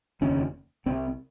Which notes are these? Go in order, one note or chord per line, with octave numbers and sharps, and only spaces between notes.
F1 D#2 C#3 C#4
C2 C3 C4